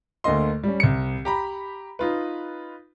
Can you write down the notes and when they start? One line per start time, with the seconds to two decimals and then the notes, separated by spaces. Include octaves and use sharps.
0.24 D2 D3 A#3 D#5 C6
0.64 G3 C#4
0.80 C2 C#7
1.25 G4 A#5 B5
1.99 D#4 F4 B4